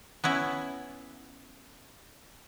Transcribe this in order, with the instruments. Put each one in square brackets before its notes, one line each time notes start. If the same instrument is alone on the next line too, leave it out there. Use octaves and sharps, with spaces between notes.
[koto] B3 C#4 E4